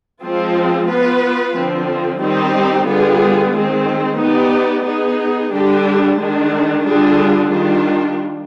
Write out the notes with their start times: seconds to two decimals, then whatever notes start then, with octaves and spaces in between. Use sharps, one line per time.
0.23 F3 G#3 C4 F4
0.89 B3 F4 B4
1.55 D3 F3 C4
2.21 D#3 G3 C4 D#4 G4
2.87 D3 G3 B3 F4 G#4
3.54 D#3 G#3 C4
4.19 B3 D#4 G4 D5
4.86 B3 D#4 G#4
5.53 D3 G3 D4 G4
6.18 D#3 G#3 D4
6.85 D3 G3 D4 F4 G#4
7.52 D#3 G3 D4 F4